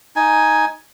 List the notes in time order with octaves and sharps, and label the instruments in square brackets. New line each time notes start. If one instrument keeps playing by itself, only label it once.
[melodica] D#4 G#5